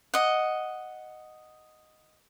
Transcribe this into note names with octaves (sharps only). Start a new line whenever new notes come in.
D#5 F#5